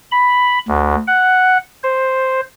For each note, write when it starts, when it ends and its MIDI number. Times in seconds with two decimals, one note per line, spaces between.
0.12 0.59 83
0.68 0.95 38
1.07 1.58 78
1.83 2.41 72